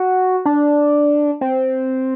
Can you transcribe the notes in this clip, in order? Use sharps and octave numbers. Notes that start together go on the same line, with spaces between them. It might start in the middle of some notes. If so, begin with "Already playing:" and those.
Already playing: F#4
D4
C4